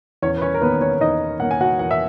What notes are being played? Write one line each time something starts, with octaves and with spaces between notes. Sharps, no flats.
E2 C#4 C#5
B4
C#4 C#5
A#4
D#3 A#3 B3 C#4 B4
C#4 C#5
E2 D#4 D#5
D#3 A#3 C#4 F#5
G#5
F#4 F#5
E2 F#5
E5